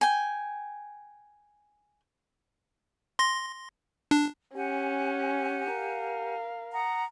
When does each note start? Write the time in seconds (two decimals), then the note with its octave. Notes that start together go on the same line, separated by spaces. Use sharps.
0.01 G5 G#5
3.19 C6 A#6
4.11 D4
4.56 C#4 G4 F#5 G#5
5.72 A#4 F5
6.73 F#5 A#5 D#6